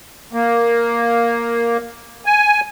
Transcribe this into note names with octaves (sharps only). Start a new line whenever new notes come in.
A#3
G#5